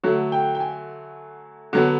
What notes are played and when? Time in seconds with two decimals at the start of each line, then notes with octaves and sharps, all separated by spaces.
0.04 D3 F#3 A3 C#5
0.32 G5
0.55 G5
0.60 G#5
1.73 D3 F#3 B3